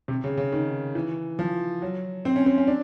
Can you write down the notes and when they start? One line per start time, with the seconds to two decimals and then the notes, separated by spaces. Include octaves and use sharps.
0.08 C3
0.24 C#3
0.37 C#3
0.52 D#3
0.95 E3
1.39 F3
1.82 F#3
2.25 C4
2.36 C#4
2.46 C4
2.58 C#4
2.67 D4